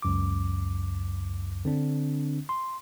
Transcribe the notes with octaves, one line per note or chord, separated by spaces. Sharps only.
C#2 F#2 D6
D3 C4 D4
C6